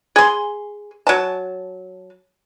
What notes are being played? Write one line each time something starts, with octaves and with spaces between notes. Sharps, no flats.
G#4 C6
F#3 A5